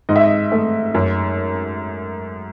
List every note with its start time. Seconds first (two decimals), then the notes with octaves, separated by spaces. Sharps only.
0.09 G#2 D#5
0.16 E5
0.24 D#5
0.52 A3
0.94 F#2